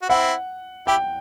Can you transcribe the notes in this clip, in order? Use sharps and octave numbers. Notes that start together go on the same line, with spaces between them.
F#4
C4 E4 F#5
E4 G4 G5